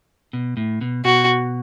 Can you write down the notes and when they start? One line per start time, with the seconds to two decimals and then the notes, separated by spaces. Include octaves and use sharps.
0.33 B2
0.57 A2
0.81 B2
1.05 B2 F#4